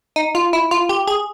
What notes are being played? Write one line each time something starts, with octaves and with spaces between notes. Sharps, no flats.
D#4
F4
E4
F4
G4
G#4